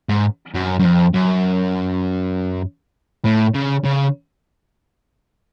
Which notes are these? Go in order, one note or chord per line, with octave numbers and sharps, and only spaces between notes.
G#2
F#2
F#2
F2
F#2
A2
C#3
C#3